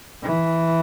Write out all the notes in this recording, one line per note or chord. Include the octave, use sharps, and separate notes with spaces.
E3